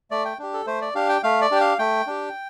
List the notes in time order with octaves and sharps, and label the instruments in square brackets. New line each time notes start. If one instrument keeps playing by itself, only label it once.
[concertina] A3 D5
G5
D4 G4
A4
A3 C5
D5
D4 G4 F5
G5
A3 F5
D5
D4 G4 G5
F5
A3 G5
D4 G4